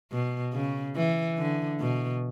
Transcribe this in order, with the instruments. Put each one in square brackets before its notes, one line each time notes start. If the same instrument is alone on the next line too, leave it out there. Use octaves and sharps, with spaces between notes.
[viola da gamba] B2
C#3
E3
D3
B2